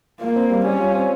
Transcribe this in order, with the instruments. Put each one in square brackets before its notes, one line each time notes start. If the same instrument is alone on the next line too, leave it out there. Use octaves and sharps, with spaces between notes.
[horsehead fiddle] A#3 [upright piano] F4
[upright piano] C4
G3
[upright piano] G3 [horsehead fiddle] C#4
[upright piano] F4
C4